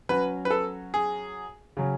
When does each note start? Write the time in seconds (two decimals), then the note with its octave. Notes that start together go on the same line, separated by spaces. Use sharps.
0.09 F#3 C#4 F#4 B4
0.45 B4
0.51 A4
0.94 G#4
1.77 C#3 F#3 C#4